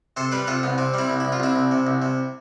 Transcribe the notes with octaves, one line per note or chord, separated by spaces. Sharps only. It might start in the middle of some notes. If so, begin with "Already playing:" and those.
C3 A4 C5
G3 G4 B4
C3 F4 A4
C2 B3
C3 C4
G3 C4 E4
C2
C2 E4
F4
C2 C4 E4
C2
C3
C2
C3